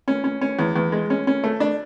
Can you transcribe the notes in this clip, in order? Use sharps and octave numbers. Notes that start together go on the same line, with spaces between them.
C#4
C#4
C#4
E2
E2
G#3
C#4
C#4
A3
D4